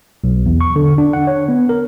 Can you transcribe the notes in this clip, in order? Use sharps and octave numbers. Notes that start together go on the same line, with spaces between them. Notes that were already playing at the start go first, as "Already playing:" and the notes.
B1
E2
C#6
D3
D4
F#5
C#5
B3
A#4